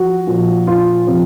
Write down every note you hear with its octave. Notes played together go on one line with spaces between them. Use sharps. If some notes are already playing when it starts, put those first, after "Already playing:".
Already playing: F3 F#4
A#2 F3
F4
C3 F3